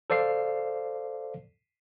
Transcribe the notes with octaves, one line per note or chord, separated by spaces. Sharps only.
A4 C5 D5 F5 C7